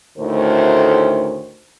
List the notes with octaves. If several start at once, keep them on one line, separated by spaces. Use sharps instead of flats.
D2 A2 D#3 A3 A#4 C5